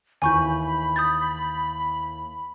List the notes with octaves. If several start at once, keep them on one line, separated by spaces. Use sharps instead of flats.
D#2 E3 G#5 B5 C#6 G6
D#6 G6 A6